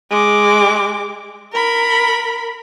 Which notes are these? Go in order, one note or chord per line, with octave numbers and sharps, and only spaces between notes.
G#3 D6
A#4 B5